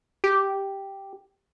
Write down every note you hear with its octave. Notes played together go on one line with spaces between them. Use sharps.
G4